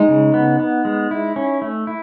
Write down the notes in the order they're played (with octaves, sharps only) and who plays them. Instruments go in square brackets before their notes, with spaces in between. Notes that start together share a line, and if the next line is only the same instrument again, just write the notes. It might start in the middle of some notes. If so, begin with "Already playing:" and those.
Already playing: [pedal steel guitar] G#3 [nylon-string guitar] D#4
[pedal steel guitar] C#3
B3
B3
G#3
E4
C#4
A3
E4